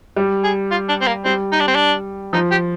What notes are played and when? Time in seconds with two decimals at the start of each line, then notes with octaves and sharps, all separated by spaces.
0.16 G3
0.44 G#4
0.71 F4
0.89 D4
1.01 C4
1.07 A#3
1.25 G3 C4
1.52 D#4
1.60 D4
1.67 C4
1.75 D4
2.33 F3 D#4
2.51 G4